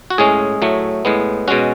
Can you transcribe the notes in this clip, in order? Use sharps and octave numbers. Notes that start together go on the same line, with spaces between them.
F#4
A2 G#3 C#4 G#4
A2 F#3 A3
A2 G#3 B3
B2 G#3 C#4 F#4